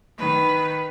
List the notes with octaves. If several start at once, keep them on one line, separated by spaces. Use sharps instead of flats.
D#3 B4